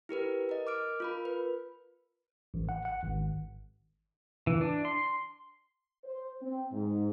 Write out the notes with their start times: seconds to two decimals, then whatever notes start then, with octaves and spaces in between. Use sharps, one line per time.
0.09 E4 G4 A#4 B4
0.49 A#4 D#5
0.67 D6 F6 D7
1.00 F4 A#4 B5
1.25 B4
2.54 A1
2.69 F#5
2.85 F#5
3.03 G#1
4.47 E3
4.61 D4
4.85 C6
6.04 C5
6.40 C4
6.71 G#2